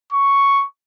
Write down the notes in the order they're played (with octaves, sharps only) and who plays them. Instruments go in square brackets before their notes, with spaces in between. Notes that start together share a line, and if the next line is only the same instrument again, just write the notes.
[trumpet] C#6